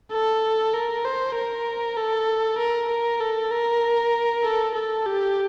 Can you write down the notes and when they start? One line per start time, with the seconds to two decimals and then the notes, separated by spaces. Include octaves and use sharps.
0.12 A4
0.74 A#4
1.05 C5
1.35 A#4
1.97 A4
2.59 A#4
2.89 A#4
3.20 A4
3.51 A#4
4.44 A4
4.75 A4
5.06 G4